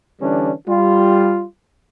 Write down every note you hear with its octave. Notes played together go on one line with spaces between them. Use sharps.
D3 E3 G3 C#4 D4
G3 F4